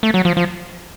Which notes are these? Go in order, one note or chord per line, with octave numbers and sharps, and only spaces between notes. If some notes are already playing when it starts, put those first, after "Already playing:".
A3
F#3
F3
F3